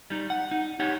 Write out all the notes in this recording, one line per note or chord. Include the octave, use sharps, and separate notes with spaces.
G3 D#4
F#5
D#4
D#4 G4 C#5 F#5